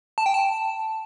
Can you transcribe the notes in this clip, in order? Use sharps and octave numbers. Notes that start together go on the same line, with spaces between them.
A5
G5
A5